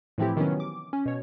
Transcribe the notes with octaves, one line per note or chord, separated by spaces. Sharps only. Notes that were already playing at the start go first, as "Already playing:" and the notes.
A2 E3 F3 C4 E4 G4
C3 D#3 E3 F#3 B3 C#4
D6
C#4
B2 C#5